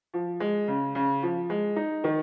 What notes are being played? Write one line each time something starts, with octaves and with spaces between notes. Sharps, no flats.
F3
G#3
C#3
C#3
F3
G#3
D#4
D#3